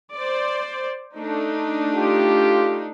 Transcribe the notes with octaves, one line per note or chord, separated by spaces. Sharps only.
C5 D5
A3 D4 D#4
F4 G4